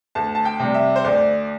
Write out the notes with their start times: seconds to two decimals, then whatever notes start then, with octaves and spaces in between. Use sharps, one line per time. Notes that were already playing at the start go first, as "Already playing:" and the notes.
0.15 D2 A5
0.35 A5
0.45 G5
0.60 C3 G3
0.74 E5
0.96 C5
1.04 D2 D5